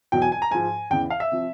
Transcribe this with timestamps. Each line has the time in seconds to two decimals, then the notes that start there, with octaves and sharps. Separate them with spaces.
0.12 E2 B2 F#3 G5
0.22 G#5
0.32 G#5
0.42 A#5
0.51 G#2 F3 G#5
0.91 E2 C#3 E3 G5
1.10 F5
1.20 E5
1.32 C3 F3